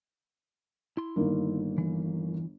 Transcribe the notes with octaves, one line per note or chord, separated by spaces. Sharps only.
E4 C6
G1 D#3 A#3
E3